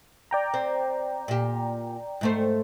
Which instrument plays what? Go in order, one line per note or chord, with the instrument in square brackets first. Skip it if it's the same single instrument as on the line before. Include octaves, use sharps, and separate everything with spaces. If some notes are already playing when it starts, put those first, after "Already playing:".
[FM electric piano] D5 G5 A#5
[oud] C4
A#2 G4
G#2 A3 C5